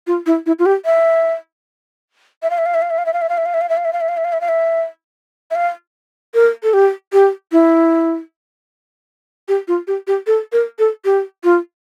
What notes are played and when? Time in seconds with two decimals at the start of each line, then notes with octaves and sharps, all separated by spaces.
0.07 F4
0.26 E4
0.46 E4
0.59 F4
0.66 G4
0.85 E5
2.42 E5
2.50 F5
2.58 E5
2.66 F5
2.74 E5
2.82 F5
2.90 E5
2.98 F5
3.06 E5
3.13 F5
3.21 E5
3.29 F5
3.37 E5
3.46 F5
3.54 E5
3.61 F5
3.69 E5
3.77 F5
3.85 E5
3.93 F5
4.01 E5
4.09 F5
4.17 E5
4.25 F5
4.32 E5
4.41 F5
4.48 E5
5.51 E5
5.55 F5
6.34 A#4
6.63 A4
6.73 G4
7.13 G4
7.52 E4
9.48 G4
9.68 F4
9.87 G4
10.07 G4
10.27 A4
10.52 A#4
10.79 A4
11.05 G4
11.44 F4